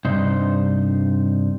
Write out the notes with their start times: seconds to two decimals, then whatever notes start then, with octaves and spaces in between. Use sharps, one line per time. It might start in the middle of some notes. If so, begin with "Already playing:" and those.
0.05 G2 C3 D#4 C5